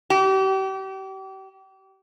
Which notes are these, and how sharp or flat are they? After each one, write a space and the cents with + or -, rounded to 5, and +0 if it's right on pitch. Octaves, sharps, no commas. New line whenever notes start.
G4 -35